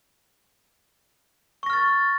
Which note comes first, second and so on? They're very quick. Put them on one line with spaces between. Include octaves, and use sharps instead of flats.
C#6 A#6 F6 A6